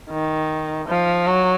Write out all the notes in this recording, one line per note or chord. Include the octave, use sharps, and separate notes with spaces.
D#3
F3
F#3